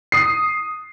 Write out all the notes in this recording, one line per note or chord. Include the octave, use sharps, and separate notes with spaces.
D#6 C7